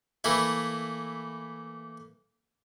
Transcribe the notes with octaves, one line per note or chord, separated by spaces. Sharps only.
E3 A3 A#3 E4